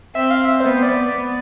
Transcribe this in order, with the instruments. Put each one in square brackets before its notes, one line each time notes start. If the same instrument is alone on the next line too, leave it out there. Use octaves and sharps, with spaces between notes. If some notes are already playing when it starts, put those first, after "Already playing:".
[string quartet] C4 [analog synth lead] E5
[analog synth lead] F5
E5
[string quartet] B3 [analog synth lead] C5
[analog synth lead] D5
[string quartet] B3